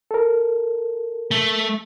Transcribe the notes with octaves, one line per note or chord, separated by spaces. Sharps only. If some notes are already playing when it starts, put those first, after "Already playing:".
A4 A#4
A3